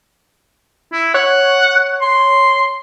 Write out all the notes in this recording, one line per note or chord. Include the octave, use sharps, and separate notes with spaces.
E4
C#5 F#5
C6